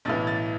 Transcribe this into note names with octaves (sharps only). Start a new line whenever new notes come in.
B1 A2 E3 A6
A6